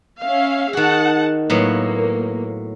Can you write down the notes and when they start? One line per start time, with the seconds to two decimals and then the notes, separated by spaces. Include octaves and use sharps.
0.22 C#4 E5 F5
0.73 D#3 F#4 G#4 F#5 A5
1.50 A2 F#3 A#3 B3